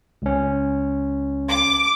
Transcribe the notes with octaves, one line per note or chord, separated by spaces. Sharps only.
C#2 C#4
D6